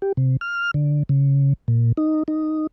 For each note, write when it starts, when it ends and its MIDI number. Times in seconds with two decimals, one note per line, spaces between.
0.02 0.12 67
0.17 0.37 48
0.41 0.71 89
0.74 1.03 50
1.09 1.53 49
1.68 1.92 46
1.97 2.23 63
2.28 2.67 63